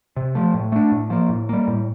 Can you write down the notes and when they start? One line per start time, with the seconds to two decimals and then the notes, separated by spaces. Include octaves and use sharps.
0.17 C3
0.35 F3 A3
0.54 A2
0.72 A3 D4
0.91 A2
1.10 F3 A#3
1.29 A2
1.49 G3 A#3
1.67 A2